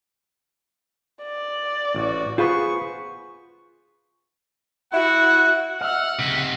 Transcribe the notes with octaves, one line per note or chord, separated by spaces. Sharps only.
D5
A1 F#4
B3 F4 G#4 B4 C5 F5 C#6
E4 F#4 F#5
D#5 E5 F#5 F6
C#2 C3 D#4 B6